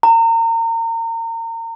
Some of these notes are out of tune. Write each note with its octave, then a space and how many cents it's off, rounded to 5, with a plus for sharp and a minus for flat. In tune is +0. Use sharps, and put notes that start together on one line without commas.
A#5 -30